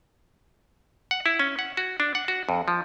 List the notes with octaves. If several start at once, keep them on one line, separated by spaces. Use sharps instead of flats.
F#5
E4
C#4
F#5
F#4
D4
F#5
F#4
F2
F3